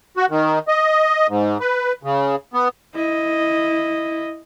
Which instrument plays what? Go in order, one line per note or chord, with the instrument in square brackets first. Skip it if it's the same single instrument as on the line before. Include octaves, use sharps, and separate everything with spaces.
[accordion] F#4
D#3
D#5
G#2
B4
C#3
B3
[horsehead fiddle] E4 D#5